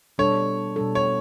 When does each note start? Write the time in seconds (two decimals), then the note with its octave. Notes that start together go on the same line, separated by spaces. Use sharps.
0.18 B2 G3 D4 A4 C#5
0.76 B2 G3 D4 A4
0.95 C#5